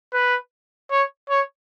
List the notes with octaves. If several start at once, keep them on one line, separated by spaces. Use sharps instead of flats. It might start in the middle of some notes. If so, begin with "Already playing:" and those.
B4
C#5
C#5